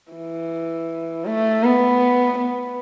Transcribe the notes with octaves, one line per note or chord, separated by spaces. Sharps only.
E3
A3
B3
B3